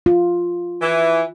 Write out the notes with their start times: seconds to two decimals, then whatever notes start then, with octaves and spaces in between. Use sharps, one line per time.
0.06 F4
0.80 E3